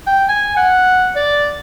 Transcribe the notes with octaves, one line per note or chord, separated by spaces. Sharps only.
G5
G#5
F#5
D5